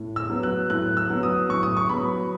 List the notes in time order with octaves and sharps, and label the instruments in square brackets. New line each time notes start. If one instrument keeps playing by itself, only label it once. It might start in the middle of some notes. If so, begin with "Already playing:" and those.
Already playing: [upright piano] A2
E6
F#3 B3
F#6
A2 F#6
E6
F#3 B3
D#6
A2 C#6
D#6
C#6
F#3 B3 B5